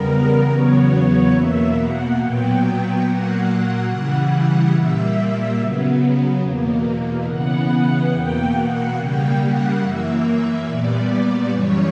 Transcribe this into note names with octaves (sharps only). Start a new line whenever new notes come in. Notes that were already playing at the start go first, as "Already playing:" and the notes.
Already playing: E2 C#3 G3 B3 A#4
E2 C#3 F#3 B3 C#5
E2 B2 A#3 E5
F#5
A#2 F#3 B3 G5
A#2 F#3 A#3 F#5
C#3 E3 G3 F#5
F#5
A#2 G3 A#3 E5
C#3 F#3 B3
E2 B2 A#3
C#3 E3 B3 F#5
E2 B2 A#3 G5
F#5
C#3 G3 A#3 G5
F#5
F#2 E3 A#3 E5
A#2 G3 B3 D5
F#2 C#3 E3 G3 C#5